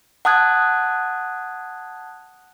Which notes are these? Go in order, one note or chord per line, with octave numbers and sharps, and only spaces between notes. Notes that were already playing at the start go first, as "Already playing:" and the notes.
F#5 A5 D#6 F#6 G#6